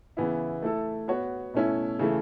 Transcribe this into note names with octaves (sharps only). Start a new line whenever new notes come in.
C#3 E3 B3 E4
A3 E4 A4
B3 F#4 C#5
B2 A3 C#4 E4
C#3 E3 A3 E4